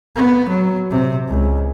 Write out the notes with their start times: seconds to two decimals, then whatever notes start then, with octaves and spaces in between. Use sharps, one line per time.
0.16 B3
0.49 F#3
0.91 C3
1.28 C#2